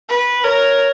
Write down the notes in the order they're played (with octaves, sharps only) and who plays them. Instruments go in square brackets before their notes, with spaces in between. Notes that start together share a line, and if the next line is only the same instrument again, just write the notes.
[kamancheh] B4
[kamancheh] A#4 [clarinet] C#5